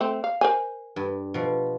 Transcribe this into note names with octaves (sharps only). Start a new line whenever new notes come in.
A3 C4
F5
A#4 C5 G#5
G2
B2 F3